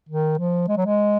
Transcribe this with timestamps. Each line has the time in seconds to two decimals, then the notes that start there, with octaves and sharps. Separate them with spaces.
0.09 D#3
0.39 F3
0.69 G#3
0.77 F#3
0.86 G#3